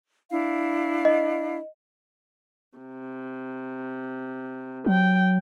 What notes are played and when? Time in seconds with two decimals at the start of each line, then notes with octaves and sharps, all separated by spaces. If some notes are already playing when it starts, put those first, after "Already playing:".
0.31 D4 E4 F5
1.05 D#5
2.78 C3
4.86 F#3 G5